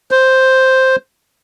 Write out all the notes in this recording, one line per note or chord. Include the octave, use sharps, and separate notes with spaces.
C5